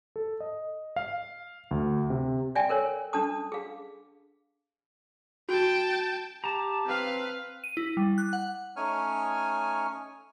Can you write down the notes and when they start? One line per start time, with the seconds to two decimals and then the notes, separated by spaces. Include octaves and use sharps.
0.16 A4
0.40 D#5
0.96 F5
1.71 D2
2.10 C3
2.55 D5 E5 G5 G#5
2.69 A4 A#4 C#5
3.13 D4 A4 A5 D#6
3.52 G#4 F5
5.49 F#4 G5 A5
6.44 G4 A5 A#5
6.87 C4 B4 F5
7.64 D#7
7.77 E4
7.97 G3
8.18 F#6
8.33 F#5
8.76 A3 C#4 D#4 C#5 G#5 F6